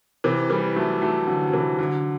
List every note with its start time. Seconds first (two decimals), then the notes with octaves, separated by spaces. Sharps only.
0.24 C3 E3
0.50 E3 G3
0.76 F#3 A3
1.01 F#3 A3
1.27 D3 F#3
1.47 F#3
1.53 C3 E3
1.79 D3 F#3